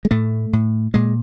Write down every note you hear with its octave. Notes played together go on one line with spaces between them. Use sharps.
G#3
A2 A3
A2
A#2 G#3